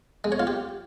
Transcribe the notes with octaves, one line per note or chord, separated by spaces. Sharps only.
G#3
C#5
F4
G4